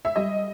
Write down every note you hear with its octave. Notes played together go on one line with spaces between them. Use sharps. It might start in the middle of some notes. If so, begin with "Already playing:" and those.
E5
G3 D#5